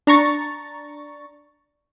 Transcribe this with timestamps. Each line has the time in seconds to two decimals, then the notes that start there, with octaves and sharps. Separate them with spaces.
0.07 D4 A#5 C#6 A6